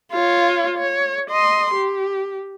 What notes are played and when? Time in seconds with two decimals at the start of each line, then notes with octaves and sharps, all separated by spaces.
0.12 F4 C#5
0.78 C#5
1.30 D#5 C6
1.74 G4